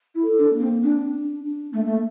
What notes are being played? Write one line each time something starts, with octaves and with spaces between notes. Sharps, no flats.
E4
A4
D4
A#3
C4
C4 D4
D4
D4
A3 A#3
A3